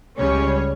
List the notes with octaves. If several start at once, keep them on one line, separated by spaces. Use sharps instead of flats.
C#2 C#3 G3 C#4 C#5